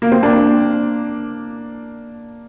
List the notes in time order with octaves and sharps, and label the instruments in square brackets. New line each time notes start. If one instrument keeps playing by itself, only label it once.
[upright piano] A#3
C4
A#3 D4